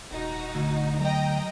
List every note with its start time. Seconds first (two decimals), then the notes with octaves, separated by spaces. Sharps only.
0.11 D#1 D#4 F#4
0.55 D2
0.99 F#3 D#5 G5 A#5